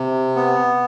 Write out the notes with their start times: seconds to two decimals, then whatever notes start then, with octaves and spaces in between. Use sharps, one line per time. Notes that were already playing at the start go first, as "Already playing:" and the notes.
Already playing: C3
0.36 B3